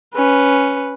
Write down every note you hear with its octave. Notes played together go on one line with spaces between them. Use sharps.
C#4 B4